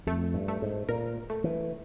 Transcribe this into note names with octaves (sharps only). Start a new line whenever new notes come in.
F2 A3
G2
A3
G#2
A#2 A#4
A3
E3